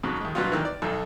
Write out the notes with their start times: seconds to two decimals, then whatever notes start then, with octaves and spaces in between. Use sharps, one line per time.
0.03 F2 G#2 C#3 F#3
0.21 D#2 G#3
0.35 G2 B2 F#3 G3 F4
0.52 A#2 D#3 E3
0.65 D5
0.82 B1 F2 D#4 A4